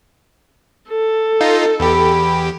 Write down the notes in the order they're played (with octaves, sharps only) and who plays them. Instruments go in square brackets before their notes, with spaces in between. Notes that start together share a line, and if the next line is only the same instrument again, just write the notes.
[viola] A4
[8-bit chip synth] D#4 F4
[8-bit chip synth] E2 G4 [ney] B5